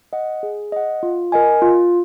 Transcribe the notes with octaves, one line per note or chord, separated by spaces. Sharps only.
D#5 F#5
G#4
D#5 F#5
F4
A#4 D#5 G#5
F4